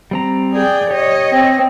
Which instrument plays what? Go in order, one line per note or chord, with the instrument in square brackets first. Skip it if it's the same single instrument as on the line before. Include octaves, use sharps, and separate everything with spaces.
[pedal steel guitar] G3 C4 A#5
[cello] G#4 G5 [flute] D5
[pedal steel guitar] G4 [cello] C#5 D#5
[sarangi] C4 [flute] A#6